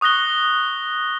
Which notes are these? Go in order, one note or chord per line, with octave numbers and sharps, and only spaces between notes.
C#6 D#6 F#6 A#6 G7